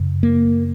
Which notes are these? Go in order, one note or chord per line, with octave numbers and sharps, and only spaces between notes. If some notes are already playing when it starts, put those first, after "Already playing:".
Already playing: F#2 C#3
A#3